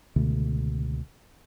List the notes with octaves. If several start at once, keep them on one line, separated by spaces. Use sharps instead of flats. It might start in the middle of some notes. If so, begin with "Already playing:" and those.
C#2 B2 D3 A3